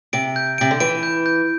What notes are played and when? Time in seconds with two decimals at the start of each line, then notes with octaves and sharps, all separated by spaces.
0.13 C3 D7
0.36 G6
0.58 C3 D7
0.71 D3
0.80 E3 D7
1.03 G6
1.26 G6